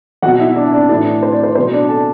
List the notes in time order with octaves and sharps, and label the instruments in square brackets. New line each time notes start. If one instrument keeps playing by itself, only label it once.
[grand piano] F#3 F#4 F#5
B2
E4 E5
D4 D5
D4 D5
A2 E3 D4 D5
C5
D5
C5
B2 F#3 C5
D4 D5
A4 A5